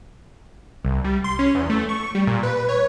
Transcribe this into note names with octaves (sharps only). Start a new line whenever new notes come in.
C2
G3
C6
C#4
E2
A3
C#6
G3
A#2
B4
C#5